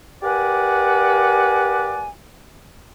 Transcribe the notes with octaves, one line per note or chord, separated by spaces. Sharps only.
G4 A#4 B4 D5 F#5 G#5